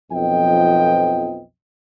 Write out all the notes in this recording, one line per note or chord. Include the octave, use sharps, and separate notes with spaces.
B1 F2 F3 B3 D#5 G5